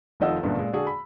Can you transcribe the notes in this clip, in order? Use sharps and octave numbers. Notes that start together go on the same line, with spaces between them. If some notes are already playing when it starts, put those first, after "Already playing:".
F1 D#3 F3 D#5 F#5 E6
F#1 G2 A#2 D3 B3
A#2 G#3
D3 D4 F#4 G#4
B5